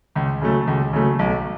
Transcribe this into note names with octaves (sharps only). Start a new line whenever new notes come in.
C#2
C#3 F#3 A3
C#2
C#3 F#3 A3
B1